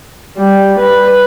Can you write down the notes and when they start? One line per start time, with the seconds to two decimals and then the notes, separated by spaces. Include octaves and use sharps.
0.37 G3
0.79 B4